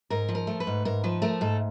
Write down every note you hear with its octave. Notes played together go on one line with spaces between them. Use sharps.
G#2 A#4
F3
A#4
A3
B4
G#2
G#2 A#4
F3 B4
A3 A#4
G#2 A4